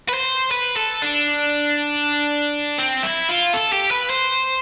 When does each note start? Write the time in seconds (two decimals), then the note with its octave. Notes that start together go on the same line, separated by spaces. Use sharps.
0.09 B4
0.14 C5
0.51 B4
0.77 A4
1.02 D4
2.78 C4
3.03 E4
3.29 F4
3.54 A4
3.73 G4
3.91 B4
4.10 C5